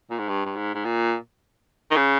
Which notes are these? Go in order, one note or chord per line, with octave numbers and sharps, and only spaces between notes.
A#2
G#2
G2
G2
G#2
G#2
A#2
D#3
C#3